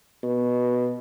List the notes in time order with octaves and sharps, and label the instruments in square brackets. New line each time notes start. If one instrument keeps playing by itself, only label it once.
[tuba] B2